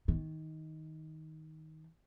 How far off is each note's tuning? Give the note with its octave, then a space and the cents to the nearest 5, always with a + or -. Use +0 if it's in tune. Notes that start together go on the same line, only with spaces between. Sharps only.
D#3 +15